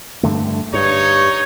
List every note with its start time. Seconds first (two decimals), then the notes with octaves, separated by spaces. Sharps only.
0.23 G2 D3 A3
0.74 G2 D#4 C#5